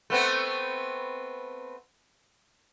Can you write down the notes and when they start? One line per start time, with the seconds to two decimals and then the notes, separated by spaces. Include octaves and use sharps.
0.10 A3 B3 C4